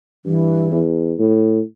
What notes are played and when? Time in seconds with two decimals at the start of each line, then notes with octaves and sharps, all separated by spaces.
0.25 G2 E3
0.71 E2
1.19 A2